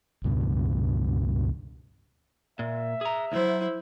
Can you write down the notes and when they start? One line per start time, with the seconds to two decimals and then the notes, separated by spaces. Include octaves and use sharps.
0.24 C#2 G2 B2
2.59 A#2 E5
3.01 G#4 A#5
3.32 D2 F#3 E4 C5